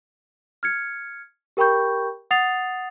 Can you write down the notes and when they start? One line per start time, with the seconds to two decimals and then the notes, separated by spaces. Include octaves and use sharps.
0.63 F6 G#6 C#7
1.57 G4 A#4 G5 B5 C#6 G6
2.31 F#5 D#6 A6 C7 F7